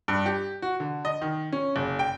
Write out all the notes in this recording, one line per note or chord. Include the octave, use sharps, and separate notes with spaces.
G2
G4
F#4
D3
D#5
D#3
C#4
F#1
G5